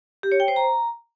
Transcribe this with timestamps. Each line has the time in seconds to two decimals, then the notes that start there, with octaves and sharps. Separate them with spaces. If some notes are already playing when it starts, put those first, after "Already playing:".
0.23 G4
0.32 C#5
0.40 G5
0.48 C5
0.56 A#5